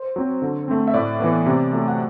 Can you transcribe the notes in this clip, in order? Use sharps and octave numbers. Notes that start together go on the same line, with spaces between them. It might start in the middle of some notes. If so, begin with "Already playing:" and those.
Already playing: C5
F#3 C4
D3
A3 C4
E5
A2 D5
E3 B3
C3
F#3 A3
F#5